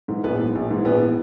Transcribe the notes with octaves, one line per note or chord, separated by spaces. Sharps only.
G#2 E3
A#1 B3 B4
G#2 E3
A#1
G#2 E3
A#1 B3 B4
E3